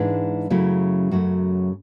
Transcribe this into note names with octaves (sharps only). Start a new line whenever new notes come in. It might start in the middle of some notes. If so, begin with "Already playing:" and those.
Already playing: G#2 E3 G#3 D4
F#2 C#3 F#3 A3 E4
F#2 C#3 F#3 A3 F#4